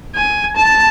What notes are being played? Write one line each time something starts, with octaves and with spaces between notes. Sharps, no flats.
G#5
A5